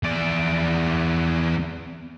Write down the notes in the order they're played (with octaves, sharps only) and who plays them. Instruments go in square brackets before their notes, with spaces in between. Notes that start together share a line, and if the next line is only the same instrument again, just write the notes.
[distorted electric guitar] E2 D5